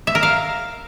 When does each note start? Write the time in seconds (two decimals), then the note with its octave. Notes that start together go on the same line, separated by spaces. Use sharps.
0.07 E5
0.15 A#4
0.23 F5